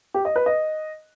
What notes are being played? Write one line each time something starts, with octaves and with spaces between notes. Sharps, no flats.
G4
D#5
B4
D#5